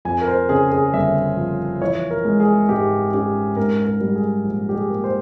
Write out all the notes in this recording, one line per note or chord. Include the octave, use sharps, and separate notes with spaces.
F2 G#5
A#4
C5
C#3 G#4
G#4
G1 E5
F3
E3 C#5
A#4
G#3
G#4
G#2 G4
C#4 G4
G#2 A#4
A#4
G3
G#4
A#1
G4
G#4
A#3
C5